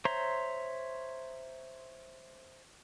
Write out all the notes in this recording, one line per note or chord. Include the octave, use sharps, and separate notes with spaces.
C5 C#5 E5 A#5 C6